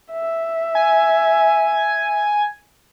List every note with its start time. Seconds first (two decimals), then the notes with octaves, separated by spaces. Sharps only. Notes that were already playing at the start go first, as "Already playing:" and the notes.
0.12 E5
0.75 G#5